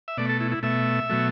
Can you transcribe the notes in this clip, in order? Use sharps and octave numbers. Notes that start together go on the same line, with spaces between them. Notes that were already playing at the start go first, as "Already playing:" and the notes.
E5
B2 A3 D5
A4
E4
E4
B2 A3 E5
B2 F#3 A3